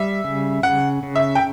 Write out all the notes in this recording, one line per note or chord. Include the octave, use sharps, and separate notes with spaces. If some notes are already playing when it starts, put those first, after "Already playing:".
Already playing: G3 E5
C#3
C#3 F#5
C#3
E5
G5